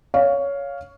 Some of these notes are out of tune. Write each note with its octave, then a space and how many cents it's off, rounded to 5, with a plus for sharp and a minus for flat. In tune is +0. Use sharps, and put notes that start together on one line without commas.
C#5 +15 F5 +0